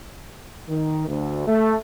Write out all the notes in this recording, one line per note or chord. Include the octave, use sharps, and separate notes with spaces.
D#3
D2
A3